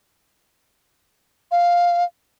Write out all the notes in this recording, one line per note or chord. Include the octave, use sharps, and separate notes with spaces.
F5